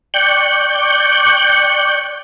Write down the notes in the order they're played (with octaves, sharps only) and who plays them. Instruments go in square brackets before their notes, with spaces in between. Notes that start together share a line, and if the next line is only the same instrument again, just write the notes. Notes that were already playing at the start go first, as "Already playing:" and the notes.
[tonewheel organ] D5 G5 C#6 F#6 G6